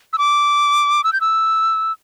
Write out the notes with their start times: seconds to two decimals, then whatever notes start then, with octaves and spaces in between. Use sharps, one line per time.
0.13 E6
0.18 D6
1.04 E6
1.13 G6
1.21 E6